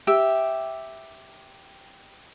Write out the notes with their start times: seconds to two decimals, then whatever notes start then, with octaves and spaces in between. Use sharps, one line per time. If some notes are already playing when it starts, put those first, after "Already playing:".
0.07 G4 E5 G5